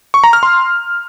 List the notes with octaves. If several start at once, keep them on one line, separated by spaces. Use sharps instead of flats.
C#6
A#5
F6
C6